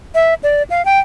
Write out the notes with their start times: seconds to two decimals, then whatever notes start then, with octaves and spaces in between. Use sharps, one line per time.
0.15 E5
0.43 D5
0.70 F5
0.85 G5